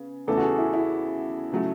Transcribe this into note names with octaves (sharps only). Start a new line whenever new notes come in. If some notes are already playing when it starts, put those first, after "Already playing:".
Already playing: C#3 B3
E2 C#3 E3 A3 A4
F#4
G#4
E4
E4
C#3 F#3 A3